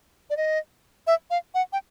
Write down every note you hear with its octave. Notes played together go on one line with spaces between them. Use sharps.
D5
D#5
E5
F5
F#5
G5